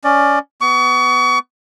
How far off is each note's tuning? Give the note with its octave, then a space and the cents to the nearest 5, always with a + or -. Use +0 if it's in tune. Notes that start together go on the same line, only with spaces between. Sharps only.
C#4 +20 D5 +20
B3 +20 C#6 +35